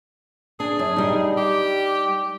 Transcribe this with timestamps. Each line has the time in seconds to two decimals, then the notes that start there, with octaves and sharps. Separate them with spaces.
0.60 D4 G#4
0.79 F#2
0.96 G3 D#4
1.37 G4